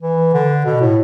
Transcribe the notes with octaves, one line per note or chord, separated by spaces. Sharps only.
E3
D3
B2
A2